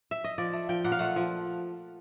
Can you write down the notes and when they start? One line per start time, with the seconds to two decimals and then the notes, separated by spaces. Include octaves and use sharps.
0.11 E5
0.24 D#5
0.38 F3 D5
0.53 A3
0.69 F3 G5
0.84 A#2 F#5
0.92 F5
0.99 A3 F#5
1.16 F3